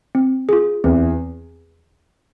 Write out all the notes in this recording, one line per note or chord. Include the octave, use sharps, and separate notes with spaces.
C4
F4 G#4
E2 E3 C4